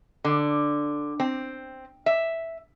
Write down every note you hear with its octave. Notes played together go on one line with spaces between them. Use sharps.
D3
C4
E5